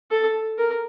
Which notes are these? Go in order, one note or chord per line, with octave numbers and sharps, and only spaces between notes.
A4
A#4